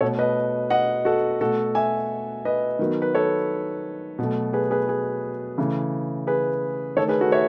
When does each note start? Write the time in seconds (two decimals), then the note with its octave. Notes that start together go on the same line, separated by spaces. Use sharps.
0.01 B2 A3 A4 C#5
0.19 B4 D#5
0.70 D#5 F#5
1.05 F#4 A4
1.41 B2 A3 F#4 A4
1.75 E5 G#5
2.45 B4 D#5
2.79 D#3 F#3 B3
3.02 B4
3.15 A4 C#5
4.19 B2 F#3 A3
4.53 G#4 B4
4.71 G#4 B4
4.89 G#4
5.58 C#3 E3 A3
6.27 G#4 B4
6.97 D#3 A3 A4 C#5
7.08 G#4 B4
7.21 F#4 A4
7.32 C#5 E5